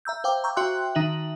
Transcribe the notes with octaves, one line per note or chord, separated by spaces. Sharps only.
E5 A#5 E6 G6
C5 F5 G5 D6
A#5 C#6 E6 G6
F#4 E5 G5 C6 F#6
D#3 D#4 E5 F#7